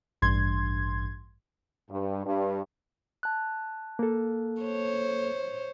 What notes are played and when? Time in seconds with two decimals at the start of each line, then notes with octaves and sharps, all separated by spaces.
0.22 A1 G2 C6 G#6
1.90 G2
2.25 G2
3.23 A5 F#6
3.99 A#3 A4
4.61 C5 C#5